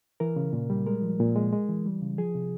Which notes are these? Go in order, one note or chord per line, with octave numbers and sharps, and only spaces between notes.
E3 A#4
C#3
A#2
G3
G#3 A#4
F3
A#2
G#3
G#3
E3
G3
C#3
F3 G#4
C3